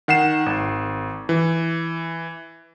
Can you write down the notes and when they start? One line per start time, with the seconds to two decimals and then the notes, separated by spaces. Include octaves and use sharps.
0.08 D#3 F#5 C7 E7
0.46 G#1
1.29 E3